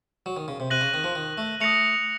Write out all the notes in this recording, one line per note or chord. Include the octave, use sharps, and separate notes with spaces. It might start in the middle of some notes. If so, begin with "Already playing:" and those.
F#3
D#3
C#3
C3
C3 F#6 A#6 D#7 F#7
C#3
D#3
F3
D#3
A3
A3 D#6 A#6 C#7 F7